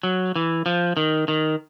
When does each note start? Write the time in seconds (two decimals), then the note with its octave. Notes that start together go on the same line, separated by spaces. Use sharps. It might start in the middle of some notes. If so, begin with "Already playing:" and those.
0.03 F#3
0.36 E3
0.66 F3
0.97 D#3
1.28 D#3